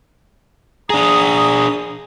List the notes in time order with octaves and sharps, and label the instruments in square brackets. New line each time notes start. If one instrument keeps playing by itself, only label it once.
[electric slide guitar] D4 G#4 [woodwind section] A#5 D#6